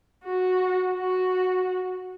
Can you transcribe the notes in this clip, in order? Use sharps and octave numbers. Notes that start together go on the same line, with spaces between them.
F#4
F#4